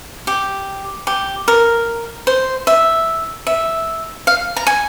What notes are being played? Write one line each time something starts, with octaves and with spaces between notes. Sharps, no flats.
G4
G4
A#4
C5
E5
E5
F5
A#5
G#5